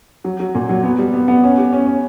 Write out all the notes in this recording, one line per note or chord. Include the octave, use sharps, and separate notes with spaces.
F#3
F#3
A#2
F#3
B3
G3
B3
B3
C#4
G4
C#4
C#4